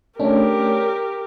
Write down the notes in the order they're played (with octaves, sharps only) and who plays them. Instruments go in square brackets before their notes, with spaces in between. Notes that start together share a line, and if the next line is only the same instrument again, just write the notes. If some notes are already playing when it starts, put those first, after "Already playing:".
[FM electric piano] A3 C#4 D4 [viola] G4 A#4